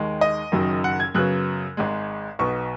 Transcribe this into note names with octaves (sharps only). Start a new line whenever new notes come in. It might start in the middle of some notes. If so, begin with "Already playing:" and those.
Already playing: D#2 D#3 G#3
D#5
F#1 F#2 D#3 F#3
F#5
G#6
F#2 C#3 F#3 B3 F#6
G#1 G#2 G#3
B1 B2 B3 C#6